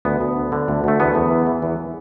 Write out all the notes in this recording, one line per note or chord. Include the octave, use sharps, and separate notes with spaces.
D2 B3
D2
D3
D3
D2
D2 A3
E2 B3
E2
E3
E3
E2